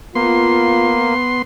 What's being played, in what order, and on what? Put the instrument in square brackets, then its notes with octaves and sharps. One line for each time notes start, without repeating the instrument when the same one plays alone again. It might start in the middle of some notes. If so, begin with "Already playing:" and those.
[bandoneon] A#3 [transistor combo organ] B3 C6 [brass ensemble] F4